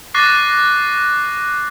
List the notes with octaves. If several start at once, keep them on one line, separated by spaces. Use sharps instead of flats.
C#6 D6 F#6 A6 A#6 C7